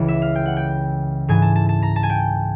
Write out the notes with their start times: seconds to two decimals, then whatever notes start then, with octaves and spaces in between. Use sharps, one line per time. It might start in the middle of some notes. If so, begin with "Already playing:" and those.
Already playing: C#2 C#3 E3
0.08 E5
0.22 F5
0.35 G5
0.46 F#5
0.57 G5
1.28 G#2 E3 G#5
1.42 A5
1.56 A5
1.69 A5
1.82 A#5
1.96 A5
2.03 G#5
2.10 G5